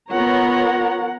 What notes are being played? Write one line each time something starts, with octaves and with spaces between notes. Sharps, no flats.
B3 F4 A#4 C#5 F#5 A#5